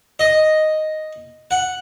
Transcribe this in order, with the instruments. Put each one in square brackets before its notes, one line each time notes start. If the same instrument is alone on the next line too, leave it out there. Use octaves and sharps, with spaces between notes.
[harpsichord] D#5
F#5